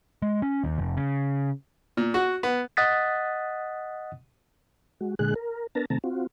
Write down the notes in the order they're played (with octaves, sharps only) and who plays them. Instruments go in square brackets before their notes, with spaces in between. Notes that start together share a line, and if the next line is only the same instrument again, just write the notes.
[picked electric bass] G#3
C#4
D#2
F1
C#3
[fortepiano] A#2
F#4
B3
[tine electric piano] D#5 F#5 D#6 F#6 A6 B6
[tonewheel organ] G#3 F#4
A#2 D3 G#3 G#4 F#6
A#4
B3 D4 A#4 B4 A5 A#5
C3 D#3 A3 C4 A5 A#5
C4 F4 F#4